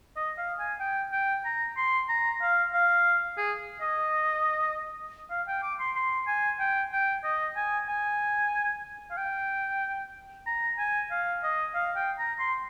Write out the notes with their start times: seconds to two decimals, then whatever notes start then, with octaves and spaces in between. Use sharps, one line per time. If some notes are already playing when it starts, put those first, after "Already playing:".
0.16 D#5
0.38 F5
0.59 G#5
0.80 G5
1.12 G5
1.45 A#5
1.77 C6
2.09 A#5
2.42 F5
2.74 F5
3.37 G#4
3.81 D#5
5.30 F5
5.48 G5
5.63 D6
5.80 C6
5.96 C6
6.27 G#5
6.59 G5
6.92 G5
7.24 D#5
7.56 G#5
7.89 G#5
9.11 F5
9.18 G5
10.46 A#5
10.78 G#5
11.11 F5
11.43 D#5
11.75 F5
11.96 G5
12.19 A#5
12.39 C6